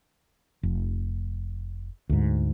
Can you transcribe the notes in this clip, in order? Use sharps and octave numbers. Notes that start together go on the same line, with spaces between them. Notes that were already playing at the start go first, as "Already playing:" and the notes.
F1
D2 G#2